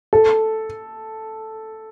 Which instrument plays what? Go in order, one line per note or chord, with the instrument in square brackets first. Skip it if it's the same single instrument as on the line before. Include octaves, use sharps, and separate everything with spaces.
[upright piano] A4